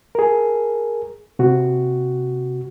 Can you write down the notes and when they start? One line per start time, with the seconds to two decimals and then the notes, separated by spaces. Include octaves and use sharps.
0.15 G#4 A#4
1.39 C3 F#4